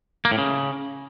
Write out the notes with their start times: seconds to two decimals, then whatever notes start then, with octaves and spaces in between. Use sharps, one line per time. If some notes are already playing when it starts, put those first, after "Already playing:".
0.25 A#3
0.31 A2
0.38 C#3